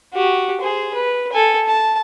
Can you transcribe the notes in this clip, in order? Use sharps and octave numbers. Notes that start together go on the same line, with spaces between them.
F#4 G4
G#4 C5
B4
A4 G#5
A5